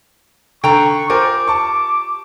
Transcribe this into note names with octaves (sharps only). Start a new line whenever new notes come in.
D3 G5 A#5 C#6
F4 G4 A#4 C5 G#5 D6
A5 C#6